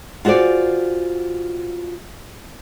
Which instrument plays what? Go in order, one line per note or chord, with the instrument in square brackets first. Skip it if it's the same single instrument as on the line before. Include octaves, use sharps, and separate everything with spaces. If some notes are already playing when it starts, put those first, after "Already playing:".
[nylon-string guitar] F4 F#4 G#4 C5 D5